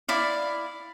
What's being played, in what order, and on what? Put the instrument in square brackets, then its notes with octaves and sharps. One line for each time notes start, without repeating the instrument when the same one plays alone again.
[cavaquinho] E4 D5 F5